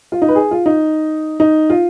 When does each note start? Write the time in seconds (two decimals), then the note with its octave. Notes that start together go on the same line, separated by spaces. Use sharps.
0.12 F4
0.22 D#4
0.28 B4
0.35 G#4
0.51 F4
0.66 D#4
1.40 D#4
1.70 F4